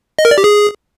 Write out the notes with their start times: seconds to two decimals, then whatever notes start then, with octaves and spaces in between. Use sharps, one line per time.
0.19 D#5
0.25 A#4
0.31 D5
0.38 G4
0.44 G#4